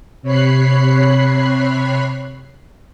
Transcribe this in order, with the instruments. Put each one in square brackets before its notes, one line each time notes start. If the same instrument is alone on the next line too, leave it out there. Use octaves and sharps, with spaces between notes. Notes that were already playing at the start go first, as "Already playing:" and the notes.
[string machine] C3 C#5 B5 F#6 C7